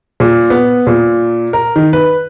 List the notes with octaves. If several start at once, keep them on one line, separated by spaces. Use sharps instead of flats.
A#2
B3
A#2
A#4
D#3
B4